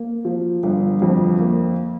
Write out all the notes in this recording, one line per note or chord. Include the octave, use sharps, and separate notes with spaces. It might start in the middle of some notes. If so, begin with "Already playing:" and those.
Already playing: A#3
F3
G1
F2
A#3